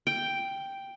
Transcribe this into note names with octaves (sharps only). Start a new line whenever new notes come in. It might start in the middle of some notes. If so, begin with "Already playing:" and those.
G5